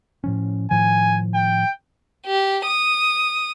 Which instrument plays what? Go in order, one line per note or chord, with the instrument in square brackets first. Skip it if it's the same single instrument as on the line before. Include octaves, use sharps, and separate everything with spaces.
[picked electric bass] A2 F3 C#4
[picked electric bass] A2 D#3 F3 [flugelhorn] G#5
[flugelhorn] G5
[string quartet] G4
D#6